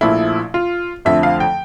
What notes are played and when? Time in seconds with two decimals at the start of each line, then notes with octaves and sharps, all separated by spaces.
0.01 A#1 A#2 F3 A3 E4
0.54 F4
1.05 F2 D3 F3 A3 E5
1.23 F5
1.40 G5